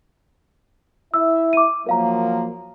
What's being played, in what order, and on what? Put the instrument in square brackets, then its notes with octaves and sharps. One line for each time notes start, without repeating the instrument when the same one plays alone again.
[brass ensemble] E4 E5 [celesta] E6
[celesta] D6 D#7
[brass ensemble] F3 F#3 A#3 [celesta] A#4 F5 A#5